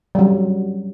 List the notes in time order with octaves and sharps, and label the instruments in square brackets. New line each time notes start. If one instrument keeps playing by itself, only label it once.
[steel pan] F#3 G3